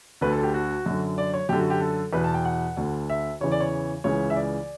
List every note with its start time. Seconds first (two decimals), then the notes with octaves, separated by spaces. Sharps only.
0.21 D2 D3 B4
0.33 A4
0.43 G4
0.54 F#4
0.86 F#2 D3
1.18 D5
1.34 C#5
1.49 F#2 D3 G4
1.60 F#4
1.70 G4
1.81 A4
2.13 E2 B4
2.16 B2
2.24 A5
2.34 G5
2.45 F#5
2.77 D2 D3
3.10 E5
3.41 E2 C#3 E3 C#5
3.52 D5
3.61 C#5
4.04 C#2 C#3 E3 C#5
4.30 E5
4.36 D5